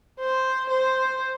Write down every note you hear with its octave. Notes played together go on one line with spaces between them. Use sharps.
C5
C5